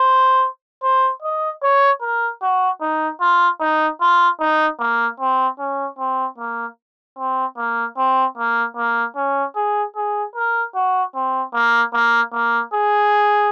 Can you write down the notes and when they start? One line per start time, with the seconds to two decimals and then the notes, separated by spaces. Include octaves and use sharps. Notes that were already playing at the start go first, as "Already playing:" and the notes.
Already playing: C5
0.83 C5
1.23 D#5
1.62 C#5
2.02 A#4
2.42 F#4
2.81 D#4
3.21 F4
3.61 D#4
4.01 F4
4.40 D#4
4.80 A#3
5.20 C4
5.59 C#4
5.99 C4
6.39 A#3
7.18 C4
7.58 A#3
7.97 C4
8.38 A#3
8.77 A#3
9.16 C#4
9.56 G#4
9.96 G#4
10.36 A#4
10.75 F#4
11.15 C4
11.54 A#3
11.94 A#3
12.33 A#3
12.74 G#4